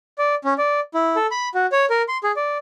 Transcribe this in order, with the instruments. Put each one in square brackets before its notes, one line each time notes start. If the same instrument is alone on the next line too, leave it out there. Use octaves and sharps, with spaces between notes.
[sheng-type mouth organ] D5
C#4
D5
E4
A4
B5
F#4
C#5
A#4
C6
G#4
D5